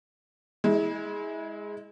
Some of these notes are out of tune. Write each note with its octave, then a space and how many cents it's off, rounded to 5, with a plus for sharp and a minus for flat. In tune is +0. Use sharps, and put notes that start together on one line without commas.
G#3 +0 E4 -30